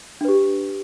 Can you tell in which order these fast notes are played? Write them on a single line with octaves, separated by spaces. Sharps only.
D4 B4 G4